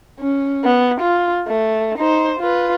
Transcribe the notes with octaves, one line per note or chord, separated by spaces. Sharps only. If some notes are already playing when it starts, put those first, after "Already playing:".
C#4
B3
F4
A3
D#4 C5
F4 B4